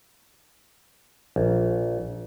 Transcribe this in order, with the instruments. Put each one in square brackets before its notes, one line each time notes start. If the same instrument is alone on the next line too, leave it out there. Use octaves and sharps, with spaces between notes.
[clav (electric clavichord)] A#1